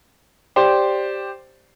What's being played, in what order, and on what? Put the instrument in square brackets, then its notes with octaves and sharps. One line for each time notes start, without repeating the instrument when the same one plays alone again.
[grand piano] G4 C5 D5